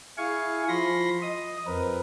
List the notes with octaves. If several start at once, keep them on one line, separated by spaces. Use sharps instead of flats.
E4 G#4 F5 G#5 C#6
F3 B5 C6 A#6
D#5 D#6
F2 C4 A#4 B4